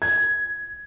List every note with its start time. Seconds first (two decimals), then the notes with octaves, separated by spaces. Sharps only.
0.02 G#6